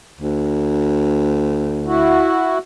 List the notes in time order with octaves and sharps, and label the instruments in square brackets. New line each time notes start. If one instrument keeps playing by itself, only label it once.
[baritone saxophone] D2
[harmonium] E4 F#4